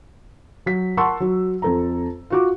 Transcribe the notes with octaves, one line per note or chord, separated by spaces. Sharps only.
F#3 B6
A#4 F#5 A5 C6 C#6 E6
F#3 F#4
F2 A4 A#5
F4 F#4 D6